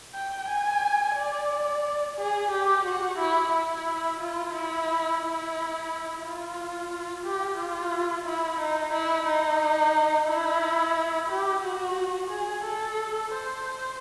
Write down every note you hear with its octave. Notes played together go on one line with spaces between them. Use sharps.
G5
G#5
D5
G#4
G4
F#4
E4
E4
F4
E4
E4
F4
G4
F4
E4
D#4
E4
D#4
E4
G4
F#4
G#4
A4
C5
C5